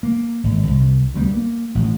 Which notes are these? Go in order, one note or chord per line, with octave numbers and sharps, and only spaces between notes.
A#3
G#1
C2
D2 G3 A#3 B3
A#3
A1